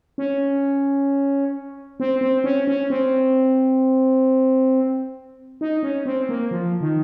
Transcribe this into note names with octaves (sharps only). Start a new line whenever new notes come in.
C#4
C4
C4
C#4
C#4
C4
D#4
C#4
C4
A#3
F3
D#3